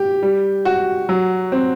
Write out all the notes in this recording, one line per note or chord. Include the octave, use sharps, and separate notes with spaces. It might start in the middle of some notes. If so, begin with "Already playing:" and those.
Already playing: G4
G3
F#4
F#3
C4